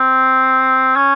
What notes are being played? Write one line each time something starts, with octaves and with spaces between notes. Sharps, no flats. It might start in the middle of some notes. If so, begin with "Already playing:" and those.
Already playing: C4
C#4